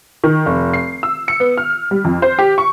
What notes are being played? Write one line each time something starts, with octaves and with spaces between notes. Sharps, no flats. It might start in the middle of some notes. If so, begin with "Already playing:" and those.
D#3
F1
C7
E6
C#7
B3
F6
G3
F2
C5
G4
C#6